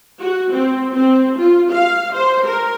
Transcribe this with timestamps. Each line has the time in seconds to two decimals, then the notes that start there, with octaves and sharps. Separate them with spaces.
0.21 F#4
0.52 C4
0.93 C4
1.37 F4
1.72 F5
2.15 C5
2.45 A#4